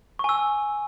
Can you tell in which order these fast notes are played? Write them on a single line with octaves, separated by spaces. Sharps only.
C#6 G#5 E6